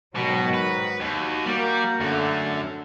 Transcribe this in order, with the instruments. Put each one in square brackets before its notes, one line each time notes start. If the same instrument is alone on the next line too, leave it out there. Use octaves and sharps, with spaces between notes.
[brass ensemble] G#2 D#3 [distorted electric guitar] B2 [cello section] F#3 F#4
[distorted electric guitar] B4
[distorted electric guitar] D#2 [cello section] F#4
[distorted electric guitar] G3 [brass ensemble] A#3
[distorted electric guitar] F#2 [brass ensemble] D3 A3